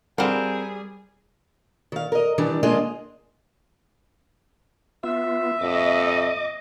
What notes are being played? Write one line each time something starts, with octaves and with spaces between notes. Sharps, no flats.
G3 C4 F4 G#4 A#4 F5 F#5
D#3 F5
A#4 D#5
D#3 E3 G3 D4
G#3 A#3 D4 F4 G#4 D#5
B3 F4 E5
F2 D#5 D6